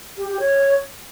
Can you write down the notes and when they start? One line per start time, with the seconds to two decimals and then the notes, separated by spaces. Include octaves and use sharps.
0.17 G4
0.29 G4
0.40 C#5